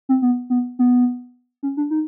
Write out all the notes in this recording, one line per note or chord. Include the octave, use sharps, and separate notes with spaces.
C4
B3
B3
B3
C#4
D4
D#4